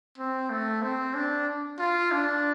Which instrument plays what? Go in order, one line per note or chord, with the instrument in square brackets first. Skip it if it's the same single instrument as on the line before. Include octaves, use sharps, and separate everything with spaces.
[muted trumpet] C4
A3
C4
D4
F4
D4